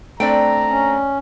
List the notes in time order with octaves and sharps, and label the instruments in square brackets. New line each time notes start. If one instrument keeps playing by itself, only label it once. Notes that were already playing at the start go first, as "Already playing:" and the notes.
[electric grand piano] A3 C4 D4 [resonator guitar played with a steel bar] D5 G5 [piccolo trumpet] A#5
[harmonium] C#4